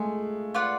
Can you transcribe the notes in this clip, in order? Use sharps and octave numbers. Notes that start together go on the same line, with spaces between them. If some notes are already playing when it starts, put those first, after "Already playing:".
Already playing: G#3 A3 F4 G#4
F4 B4 D5 F#5